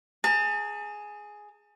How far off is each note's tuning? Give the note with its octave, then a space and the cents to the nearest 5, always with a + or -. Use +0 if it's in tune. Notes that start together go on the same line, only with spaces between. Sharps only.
G#4 +5 A5 +40